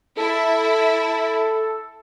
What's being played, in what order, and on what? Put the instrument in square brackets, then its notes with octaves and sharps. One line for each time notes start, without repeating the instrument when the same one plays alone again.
[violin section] E4 [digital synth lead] A4